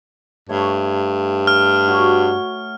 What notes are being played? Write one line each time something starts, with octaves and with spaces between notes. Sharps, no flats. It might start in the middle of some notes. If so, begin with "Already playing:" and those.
G2 A3 C#5
F6
F#4 C#5 E5